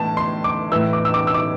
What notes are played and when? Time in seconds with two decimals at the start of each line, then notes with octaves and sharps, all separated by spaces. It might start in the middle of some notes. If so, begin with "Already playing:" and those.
Already playing: A2 E3 A5
0.17 C6
0.44 D6
0.72 A2 E3 E6
0.93 D6
1.05 E6
1.14 D6
1.27 E6
1.34 D6